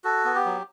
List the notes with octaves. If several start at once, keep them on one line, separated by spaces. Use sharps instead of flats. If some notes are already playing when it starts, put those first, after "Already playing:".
F#4 A4
B3
G4
F#3